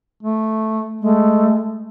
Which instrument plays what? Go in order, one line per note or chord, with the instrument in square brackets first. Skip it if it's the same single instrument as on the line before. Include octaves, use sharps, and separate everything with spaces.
[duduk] A3
[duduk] G#3 [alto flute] A3